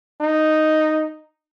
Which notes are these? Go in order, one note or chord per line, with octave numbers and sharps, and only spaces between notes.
D#4